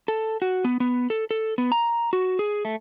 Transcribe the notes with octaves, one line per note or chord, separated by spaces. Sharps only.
A4
F#4
B3
B3
A4
A4
B3
A#5
F#4
G#4
A3